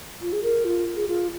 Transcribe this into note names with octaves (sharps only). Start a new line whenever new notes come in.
F4
G#4
A#4
F4
G#4
F4